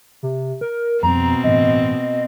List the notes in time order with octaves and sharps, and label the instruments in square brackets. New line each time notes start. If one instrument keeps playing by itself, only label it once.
[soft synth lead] C3
A#4
[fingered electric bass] F2 G3 [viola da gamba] B2 C4 [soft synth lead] A#5
[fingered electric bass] A1 G2 [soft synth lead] D#5